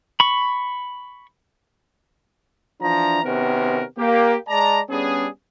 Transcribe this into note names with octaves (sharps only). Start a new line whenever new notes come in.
B5 C#6
E3 F3 D4 A#5
C3 D#3 B3 C#4 F#4 A#4
A#3 G4
G#3 D5 A5 A#5
G3 B3 C#4 D4 G#4